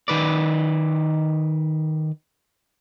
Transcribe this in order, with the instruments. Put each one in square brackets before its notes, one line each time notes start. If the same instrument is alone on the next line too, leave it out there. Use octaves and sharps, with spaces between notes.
[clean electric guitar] D#3 B4 D5